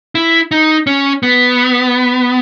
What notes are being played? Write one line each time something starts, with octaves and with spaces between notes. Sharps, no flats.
E4
D#4
C#4
B3